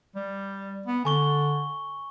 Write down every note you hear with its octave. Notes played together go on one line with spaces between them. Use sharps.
G3
B3
D3 G#5 C#6 G7